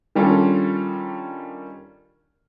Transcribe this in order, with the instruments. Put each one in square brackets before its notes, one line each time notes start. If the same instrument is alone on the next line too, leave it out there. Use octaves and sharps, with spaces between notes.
[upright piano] D#3 G3 C#4 D4 F4 A4